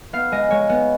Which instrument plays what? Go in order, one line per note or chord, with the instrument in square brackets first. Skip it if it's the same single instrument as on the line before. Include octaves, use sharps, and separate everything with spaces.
[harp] B3 F5
G#3 D#5
G#3 C#5
B3